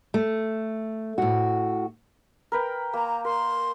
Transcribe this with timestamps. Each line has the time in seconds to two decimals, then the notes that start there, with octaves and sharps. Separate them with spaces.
0.14 A3
1.18 A2 F#4
2.52 A#4 B4 G5
2.93 A#3 A#5
3.25 A#4 C6